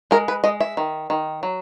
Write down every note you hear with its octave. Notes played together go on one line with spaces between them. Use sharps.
G#3 A#4
B4
G#3 D#5
E5
D#3
D#3
F#3